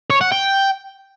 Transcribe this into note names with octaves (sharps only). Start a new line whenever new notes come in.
C#5
F#5
G5